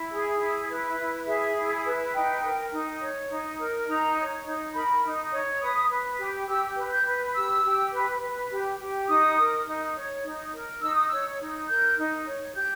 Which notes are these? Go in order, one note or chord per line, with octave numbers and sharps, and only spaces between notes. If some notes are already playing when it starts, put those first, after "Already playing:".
Already playing: E4
G#4
E4
B4
E4
G#4 E5
E4
B4
D#4 G5
A#4
D#4
C#5
D#4
A#4
D#4 A#5
C#5
D#4
A#4 B5
D#4
C#5
B4 D#6
B4
G4
G4 E6
B4
G6
B4
G4 E6
G4
B4
B4
G4
G4
D#4 D#6
A#4
D#4
C#5
D#4
A#4
D#4 E6
D#6
C#5 E6
D#4
A#4 G6
D#4
C#5
G4 G6